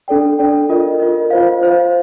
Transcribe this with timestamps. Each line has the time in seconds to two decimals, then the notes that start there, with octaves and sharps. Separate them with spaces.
0.08 D4 A4 D5 G5
0.39 D4 A4 D5 G5
0.69 F4 A#4 D#5
1.00 F4 A#4 D#5
1.30 F4 C5 F5
1.61 F4 C5 F5